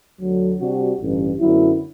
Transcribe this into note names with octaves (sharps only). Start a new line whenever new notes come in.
D2 D3 F#3
C3 G3 D4 F#4
A1 G2 D3
F#2 D3 F#3 B3 E4